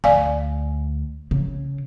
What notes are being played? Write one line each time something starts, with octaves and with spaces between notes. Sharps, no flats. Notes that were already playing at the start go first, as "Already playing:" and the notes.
D2 D5 F5 G#5
C#3